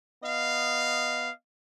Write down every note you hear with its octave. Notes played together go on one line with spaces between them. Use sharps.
B3 D#5 F5